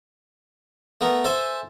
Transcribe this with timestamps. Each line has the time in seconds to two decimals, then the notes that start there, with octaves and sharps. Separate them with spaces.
1.01 A3 B3 A#4
1.24 A4 C5 E5 G#5